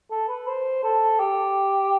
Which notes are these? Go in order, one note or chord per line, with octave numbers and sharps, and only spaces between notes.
A4
B4
C5
A4
G4